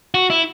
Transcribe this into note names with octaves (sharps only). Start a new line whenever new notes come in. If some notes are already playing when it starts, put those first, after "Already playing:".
F#4
E4